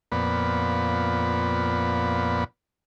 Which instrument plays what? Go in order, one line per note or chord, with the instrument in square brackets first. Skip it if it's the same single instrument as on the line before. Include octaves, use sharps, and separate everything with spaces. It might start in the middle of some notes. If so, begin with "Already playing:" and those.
[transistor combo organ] F2 A#2 B3 D5 B5